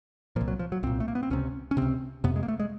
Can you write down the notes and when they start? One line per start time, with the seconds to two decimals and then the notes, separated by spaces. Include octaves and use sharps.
0.36 A#2 F3
0.41 C2
0.48 F#3
0.59 F3
0.72 F#3
0.83 C2 A#2 C4
1.00 A3
1.08 A#3
1.15 B3
1.23 C4
1.30 C#2 C3 C#4
1.71 C#4
1.77 C#2 C3 C4
2.24 F2 C3 B3
2.36 G#3
2.43 A#3
2.48 A3
2.60 G#3